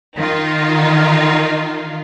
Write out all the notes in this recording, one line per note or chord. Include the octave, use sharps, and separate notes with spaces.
D#3 D#4 F4